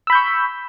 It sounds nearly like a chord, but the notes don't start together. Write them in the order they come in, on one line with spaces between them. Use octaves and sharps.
E6 B5 G6 C#6